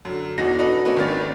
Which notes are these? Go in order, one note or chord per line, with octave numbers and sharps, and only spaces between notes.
F#2 D3
E2 B2 E3 D#4 F#4 A#6
D4 D#4 F#4 A4 B4
A#3 C4 C#4 D#4 F#4 B4
G#1 D#3 A#3 C#4 D4 A6